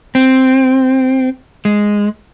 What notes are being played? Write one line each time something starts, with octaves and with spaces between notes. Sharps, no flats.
C4
G#3